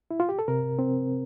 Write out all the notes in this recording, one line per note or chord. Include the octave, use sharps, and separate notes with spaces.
E4
F4
G4
A4
C3 A#4
C4